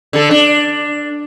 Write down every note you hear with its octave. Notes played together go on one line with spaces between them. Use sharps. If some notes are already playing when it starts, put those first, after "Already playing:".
D3 A4
D4